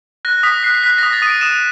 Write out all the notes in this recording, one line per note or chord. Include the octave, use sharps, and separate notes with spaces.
F#6 A#6
D#6 B6
F#6 C7
F#6 B6
A#6
D#6
A6
D#6 D#7
D7
D#6 E7